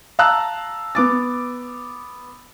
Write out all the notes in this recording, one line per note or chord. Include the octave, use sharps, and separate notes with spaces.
F5 A5 A#5 E6 F#6
B3 D6 A6